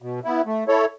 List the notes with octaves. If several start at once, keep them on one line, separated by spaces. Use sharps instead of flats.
B2
B3 E4
A3
E4 A4 C#5